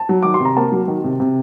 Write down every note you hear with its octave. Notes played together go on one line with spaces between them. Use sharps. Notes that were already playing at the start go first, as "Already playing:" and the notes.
Already playing: A5
F#3
D#3 D6
C6
C3 A#5
A#3 A5
F#3
D#3
C3
C3